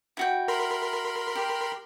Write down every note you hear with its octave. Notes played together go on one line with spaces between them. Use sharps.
E4 F#4 G5
A#4 B5 C6
G4